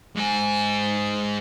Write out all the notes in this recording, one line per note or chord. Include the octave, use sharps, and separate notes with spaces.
G#2 G#5